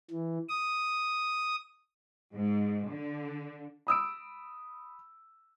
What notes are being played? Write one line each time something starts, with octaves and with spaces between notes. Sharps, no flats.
E3
D#6
G#2
D3
B5 D#6 E6 D7